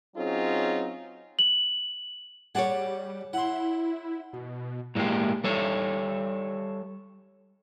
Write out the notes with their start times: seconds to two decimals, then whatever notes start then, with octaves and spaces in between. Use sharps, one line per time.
0.16 F#3 C4 C#4 D#4 F4 G#4
1.39 F#7
2.55 G3 G#4 C#5 F#5 A5 D6
3.33 E4 F#5 C6
4.33 B2
4.95 A2 F#3 G#3 A#3 G4
5.44 G3 A4 C#5